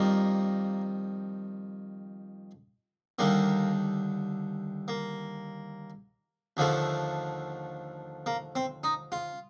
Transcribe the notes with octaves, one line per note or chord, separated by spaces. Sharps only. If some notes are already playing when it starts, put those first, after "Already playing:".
Already playing: F2 D#3 G3 A#3
D#2 D3 G3 A#3
A#3
D#2 D3 F3 A3
A#3
C4
D#4
F4